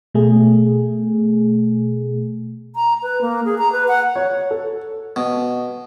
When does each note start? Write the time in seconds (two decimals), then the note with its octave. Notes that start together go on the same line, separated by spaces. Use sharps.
0.14 B2 A3 G#4
2.75 A#5
3.02 B4
3.21 A#3
3.45 G#4
3.58 A#5
3.72 B4
3.88 F#5
4.16 C#5
4.51 A4
5.16 B2